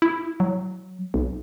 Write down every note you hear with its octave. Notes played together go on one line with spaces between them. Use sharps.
E4
F#3
B1